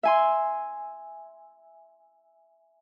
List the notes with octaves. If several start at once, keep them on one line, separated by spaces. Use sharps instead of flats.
E5 G#5 C6